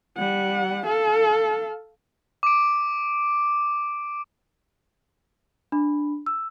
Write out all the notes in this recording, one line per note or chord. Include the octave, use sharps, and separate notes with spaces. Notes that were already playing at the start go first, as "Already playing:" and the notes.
G3 F#5
A4 F5
D6 D7
D4 B5
E6